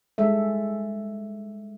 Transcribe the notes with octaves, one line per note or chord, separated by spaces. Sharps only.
G3 G#3 A4 E5